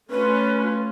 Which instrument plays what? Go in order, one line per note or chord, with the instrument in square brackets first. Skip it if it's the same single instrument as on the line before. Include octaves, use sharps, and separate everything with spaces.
[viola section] A3 C#4 F4 [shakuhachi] B4